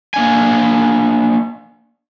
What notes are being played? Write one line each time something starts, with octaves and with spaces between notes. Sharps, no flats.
A#3 D4 G#5